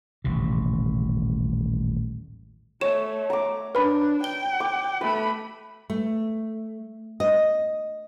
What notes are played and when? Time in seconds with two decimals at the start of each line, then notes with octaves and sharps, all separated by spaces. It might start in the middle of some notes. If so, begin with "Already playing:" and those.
0.24 D#1 A1 C3
2.81 A3 C#5 E7
3.30 A#5 D6
3.75 D4 B4 B5
4.24 G5 G7
4.60 D6
5.01 A3 B4 B5
5.90 A3
7.20 D#5